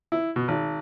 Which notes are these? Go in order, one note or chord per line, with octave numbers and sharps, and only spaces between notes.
E4
B2
G#1